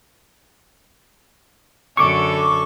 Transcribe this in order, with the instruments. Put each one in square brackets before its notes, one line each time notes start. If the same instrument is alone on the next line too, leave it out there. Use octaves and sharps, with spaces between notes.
[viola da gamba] F#2 D3 A4 [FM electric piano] C#6 D6